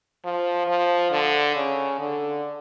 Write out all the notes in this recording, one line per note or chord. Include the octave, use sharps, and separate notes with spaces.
F3
F3
D3
C#3
D3